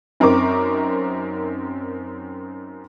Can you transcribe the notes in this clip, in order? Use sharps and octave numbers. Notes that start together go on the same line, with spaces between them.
F#2 C4 D#4 A#4 C#6 D6